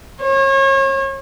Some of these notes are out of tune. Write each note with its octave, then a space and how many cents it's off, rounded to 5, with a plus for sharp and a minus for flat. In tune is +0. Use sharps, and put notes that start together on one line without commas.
C#5 -35